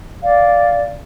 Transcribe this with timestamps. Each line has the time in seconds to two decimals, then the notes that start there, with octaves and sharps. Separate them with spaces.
0.21 D5 F5